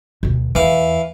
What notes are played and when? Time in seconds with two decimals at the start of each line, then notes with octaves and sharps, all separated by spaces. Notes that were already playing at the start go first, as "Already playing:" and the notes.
0.23 D2 B2
0.55 E2 E3 F5